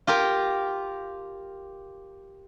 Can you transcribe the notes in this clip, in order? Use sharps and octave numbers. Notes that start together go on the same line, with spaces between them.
F4 G4 A#4